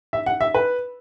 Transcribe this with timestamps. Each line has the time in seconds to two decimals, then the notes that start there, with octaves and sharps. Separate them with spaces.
0.13 E5
0.26 F#5
0.41 E5
0.54 B4